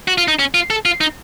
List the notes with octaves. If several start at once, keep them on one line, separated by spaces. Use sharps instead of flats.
F#4
F4
D#4
C#4
F4
A4
F4
D#4